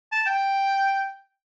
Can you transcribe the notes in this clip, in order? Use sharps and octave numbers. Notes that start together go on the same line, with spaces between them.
A5
G5